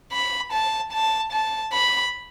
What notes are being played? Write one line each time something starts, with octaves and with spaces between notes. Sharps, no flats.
B5
A5
A5
A5
B5